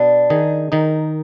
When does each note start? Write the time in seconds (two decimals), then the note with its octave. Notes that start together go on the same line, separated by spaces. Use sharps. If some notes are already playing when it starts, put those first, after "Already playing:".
Already playing: B2 B3 D4
0.30 D#3 D#4 G#4
0.72 D#3 D#4 A#4